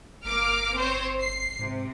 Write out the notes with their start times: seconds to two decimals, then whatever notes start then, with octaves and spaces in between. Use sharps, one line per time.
0.24 G1 A#3 D6 F6
0.75 C4 C5 C#5
1.20 C7
1.59 G#2 C3